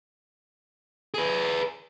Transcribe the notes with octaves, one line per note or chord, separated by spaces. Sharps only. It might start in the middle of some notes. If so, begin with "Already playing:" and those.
G#4 B4